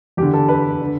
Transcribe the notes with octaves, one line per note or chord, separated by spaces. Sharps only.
E2 D3 G4
A4
B4
D3